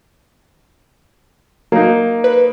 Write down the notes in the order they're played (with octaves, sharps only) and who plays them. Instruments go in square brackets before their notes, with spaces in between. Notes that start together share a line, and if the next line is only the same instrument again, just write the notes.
[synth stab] F#3 [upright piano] A#3 D#4
[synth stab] B4